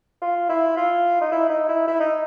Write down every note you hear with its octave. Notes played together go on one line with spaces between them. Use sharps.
F4
E4
F4
D#4
E4
D#4
E4
E4
D#4